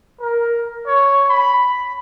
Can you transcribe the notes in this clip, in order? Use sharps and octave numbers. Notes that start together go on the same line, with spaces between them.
A#4
C#5
B5